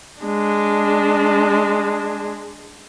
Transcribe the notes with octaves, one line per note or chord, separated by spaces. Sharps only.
G#3 D4